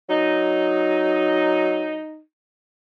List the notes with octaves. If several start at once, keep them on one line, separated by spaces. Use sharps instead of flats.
F#3 D#4